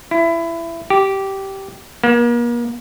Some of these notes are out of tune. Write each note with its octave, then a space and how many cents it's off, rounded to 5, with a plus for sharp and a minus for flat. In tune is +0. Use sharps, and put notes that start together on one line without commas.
E4 +20
G4 -10
A#3 +40